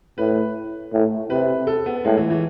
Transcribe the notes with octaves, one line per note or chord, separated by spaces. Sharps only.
A2 B4
A2
C3 B4
A4
B3
A2 G#3
E3
E3